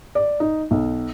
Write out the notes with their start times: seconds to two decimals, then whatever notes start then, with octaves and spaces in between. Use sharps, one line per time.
0.15 D5
0.40 D#4
0.71 B1